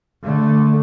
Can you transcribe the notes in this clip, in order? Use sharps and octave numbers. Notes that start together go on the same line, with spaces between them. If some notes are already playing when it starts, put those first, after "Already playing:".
D3 A3